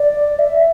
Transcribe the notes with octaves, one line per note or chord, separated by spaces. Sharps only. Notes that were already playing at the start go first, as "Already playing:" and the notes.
Already playing: D5
E5